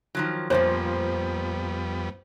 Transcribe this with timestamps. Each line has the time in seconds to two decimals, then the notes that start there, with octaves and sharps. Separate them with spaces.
0.15 D#3 F3 F#3
0.50 F2 A#2 D#3 F3 G3 B3 C5